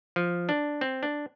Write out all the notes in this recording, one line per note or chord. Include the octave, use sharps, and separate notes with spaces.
F3
D4
C4
D4